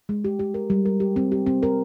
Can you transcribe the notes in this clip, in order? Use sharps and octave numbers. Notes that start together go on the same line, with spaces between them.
G#3
G4
G4
A#4
G3
A#4
G4
C4
G4
C4
A#4